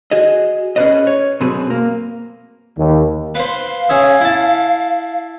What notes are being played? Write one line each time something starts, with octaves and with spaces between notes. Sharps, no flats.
F#4 G#4 D#5
C#4 G#4 A4 B4 D5 D#5
C#5
F#2 B2 C4 F#4 G#4 B4
A#3
D#2
B4 C5 F5
C#4 G#4 E5
E4 A5